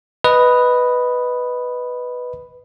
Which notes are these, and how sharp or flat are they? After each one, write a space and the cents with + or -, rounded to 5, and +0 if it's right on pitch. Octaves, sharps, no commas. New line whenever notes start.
B4 +0 D#5 +0